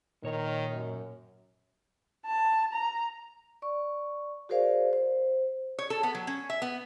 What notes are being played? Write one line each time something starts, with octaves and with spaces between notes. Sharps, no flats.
A#2 D#3 C#5 A#5
F#2
A5
A#5
D5 C#6
F#4 G#4 A#4 C5 D5 F5
C5
C#5
A4
B3
F#3
C#4
E5
B3